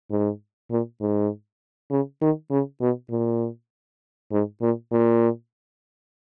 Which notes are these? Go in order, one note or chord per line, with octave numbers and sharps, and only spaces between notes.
G#2
A#2
G#2
C#3
D#3
C#3
B2
A#2
G#2
A#2
A#2